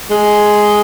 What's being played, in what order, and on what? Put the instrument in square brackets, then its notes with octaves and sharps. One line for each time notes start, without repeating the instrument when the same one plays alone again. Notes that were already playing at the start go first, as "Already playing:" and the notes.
[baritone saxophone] G#3